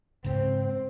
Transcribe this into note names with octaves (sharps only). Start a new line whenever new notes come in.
G#2 C#3 C4